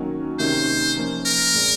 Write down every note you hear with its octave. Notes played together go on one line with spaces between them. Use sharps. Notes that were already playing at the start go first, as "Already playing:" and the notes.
Already playing: D#3 F#3 A#3 C#4
C3 D#3 A#3 C#4 C5
F3 A#3 C#4
A#4
A#2 G#3 C4